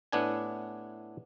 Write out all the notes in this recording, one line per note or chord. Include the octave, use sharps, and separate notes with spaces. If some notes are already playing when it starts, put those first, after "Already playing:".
A2 B3 D4 G#5